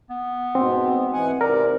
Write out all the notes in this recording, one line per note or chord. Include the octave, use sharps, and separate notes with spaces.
B3
G#2 B2 C4
E3 F#5 G#5
G#2 C3 A#4 D5